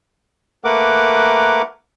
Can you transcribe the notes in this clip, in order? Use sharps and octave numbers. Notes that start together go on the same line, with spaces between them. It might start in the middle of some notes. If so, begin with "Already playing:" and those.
A3 A#3 A#4 B4 F#5 D6